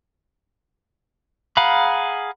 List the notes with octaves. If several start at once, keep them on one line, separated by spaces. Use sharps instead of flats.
G#4 F5 F#5 A#5 B5